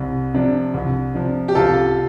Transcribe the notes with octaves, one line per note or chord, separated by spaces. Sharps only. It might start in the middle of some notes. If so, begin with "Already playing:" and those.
Already playing: C2
C3 F3 D4
C2
C3 F3 D4
G4
C2 F4 A4